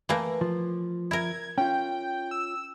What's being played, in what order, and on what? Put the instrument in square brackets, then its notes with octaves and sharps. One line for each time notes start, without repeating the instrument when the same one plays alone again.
[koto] E3 A3 A#3
[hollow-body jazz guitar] F3
[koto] E4 A#4 [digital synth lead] G#6
[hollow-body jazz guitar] C#4 F4 [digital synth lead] G5
[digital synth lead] E6